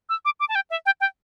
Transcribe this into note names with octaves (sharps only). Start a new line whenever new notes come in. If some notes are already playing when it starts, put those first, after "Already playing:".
E6
D6
D6
A5
G5
E5
G5
G5